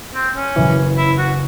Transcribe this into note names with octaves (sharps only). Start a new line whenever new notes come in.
C4
C#4
F#1 F#2 E3
E4
F#4